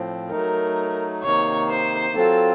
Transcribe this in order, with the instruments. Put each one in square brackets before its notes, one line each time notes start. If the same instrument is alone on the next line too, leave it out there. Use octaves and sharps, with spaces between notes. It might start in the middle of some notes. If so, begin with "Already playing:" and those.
Already playing: [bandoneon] A2 F3 C4
[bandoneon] F#3 A3 D#4 [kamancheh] A#4
[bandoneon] C3 D#3 A#3 D#4 [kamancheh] C#5
[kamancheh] C5
[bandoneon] F#3 C4 F4 [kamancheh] A4